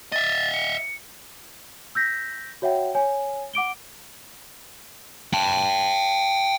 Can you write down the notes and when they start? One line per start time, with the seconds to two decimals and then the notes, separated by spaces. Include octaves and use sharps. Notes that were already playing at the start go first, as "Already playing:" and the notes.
0.12 D#5 E5 A6
0.53 C#7
1.95 E6 G6 A#6 B6
2.62 F#4 C#5 E5 F#5 G5
2.95 C#5 G#5
3.54 F#5 D6 D7 G7
5.33 G5 A5